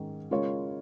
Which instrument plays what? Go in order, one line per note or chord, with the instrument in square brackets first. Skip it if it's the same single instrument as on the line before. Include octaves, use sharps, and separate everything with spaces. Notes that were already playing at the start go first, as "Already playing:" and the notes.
Already playing: [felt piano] G#2 D#3 C#4
C#3 G#3 F4 A#4 C#5